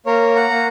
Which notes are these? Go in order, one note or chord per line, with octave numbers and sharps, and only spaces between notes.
A#3 A#4 C#5
F#5 A#5
A#3